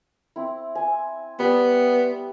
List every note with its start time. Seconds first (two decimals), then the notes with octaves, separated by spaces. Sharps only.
0.36 C4 E4
0.75 G#5
1.39 G3 B3